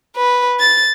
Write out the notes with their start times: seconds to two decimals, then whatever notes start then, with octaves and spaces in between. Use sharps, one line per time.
0.16 B4
0.59 A6